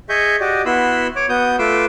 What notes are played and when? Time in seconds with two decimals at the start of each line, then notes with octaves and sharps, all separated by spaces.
0.09 G#4 D#5 E5 C#6 G6
0.40 F#4 G4 D5 D#5
0.66 B3 E4 F#4 B5 C6 E6
1.16 C#5 D6
1.29 B3 F#4 D#6 G6
1.59 A3 F4 B4 C6 D6 E6